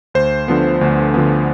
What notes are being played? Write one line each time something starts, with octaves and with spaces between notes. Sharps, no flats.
D2 C5
D3 F3 B3
D2
D3 F3 B3